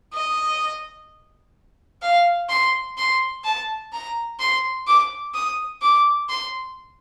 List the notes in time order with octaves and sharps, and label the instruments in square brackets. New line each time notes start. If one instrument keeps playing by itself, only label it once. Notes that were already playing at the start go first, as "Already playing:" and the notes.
[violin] D#5
F5
C6
C6
A5
A#5
C6
D6
D#6
D6
C6